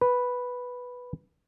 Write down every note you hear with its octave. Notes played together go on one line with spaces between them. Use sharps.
B4